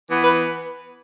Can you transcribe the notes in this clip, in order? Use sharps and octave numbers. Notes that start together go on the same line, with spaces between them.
E3 B3
B4